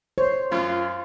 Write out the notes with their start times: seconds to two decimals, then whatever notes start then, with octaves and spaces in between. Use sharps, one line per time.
0.18 C5 C#5
0.52 F#2 F4